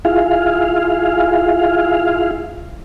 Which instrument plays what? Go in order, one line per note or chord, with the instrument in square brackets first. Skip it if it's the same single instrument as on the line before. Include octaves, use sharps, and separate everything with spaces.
[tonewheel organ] E4 F4 G#4 F5